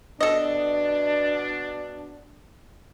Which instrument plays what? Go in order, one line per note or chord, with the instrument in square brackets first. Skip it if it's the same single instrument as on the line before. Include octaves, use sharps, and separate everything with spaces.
[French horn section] B2 D4 [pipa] A4 D#5